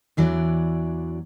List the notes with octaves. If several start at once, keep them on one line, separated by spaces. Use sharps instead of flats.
E2 E3 F#3 D4 D5